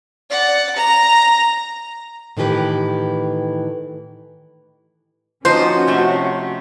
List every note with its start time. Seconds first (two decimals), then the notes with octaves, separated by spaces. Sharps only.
0.30 D5 F#5
0.76 A#5
2.37 A2 D#3 E3 G4 B4
5.45 F3 A#3 C#4 D#4 F#4 C5
5.87 C3 A3